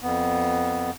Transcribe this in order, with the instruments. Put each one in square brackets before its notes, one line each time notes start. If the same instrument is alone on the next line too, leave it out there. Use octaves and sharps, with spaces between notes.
[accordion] F2 B3